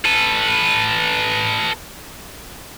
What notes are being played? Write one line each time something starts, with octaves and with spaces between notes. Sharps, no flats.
A4 B4